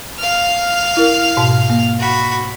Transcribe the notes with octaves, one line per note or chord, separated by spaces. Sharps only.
F5 F6
E4 A#4
G#2 B2
A#3
F#4 B5